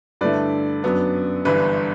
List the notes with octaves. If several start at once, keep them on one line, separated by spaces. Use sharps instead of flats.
G2 D3 A3 E4 B4 D5
F#2 F#3 B3 D4
G1 G2 E3 B4